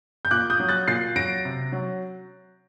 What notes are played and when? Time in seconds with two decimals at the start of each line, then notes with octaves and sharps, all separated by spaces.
0.25 G6
0.31 A#2 D6 F#6
0.50 D#6 G6
0.60 F#3
0.69 F#6 A6
0.88 A#2 A6 C7
1.16 F#3 A#6 D7
1.45 C3
1.72 F#3